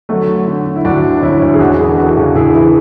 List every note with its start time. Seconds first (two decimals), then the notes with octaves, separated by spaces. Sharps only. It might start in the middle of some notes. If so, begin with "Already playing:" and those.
0.09 D3 F#3 A3
0.28 D3
0.47 D3
0.66 D3
0.76 E4
0.85 D2 D4 F#4
1.04 D3
1.17 D4
1.22 D2 C#4 E4
1.42 D2
1.54 G#4
1.60 E1 D4 F#4
1.79 E3 E4 G#4
1.98 E3 F#4 A4
2.17 C#3 D4 F#4
2.35 C#3 E4 G#4
2.54 E3 E4 G#4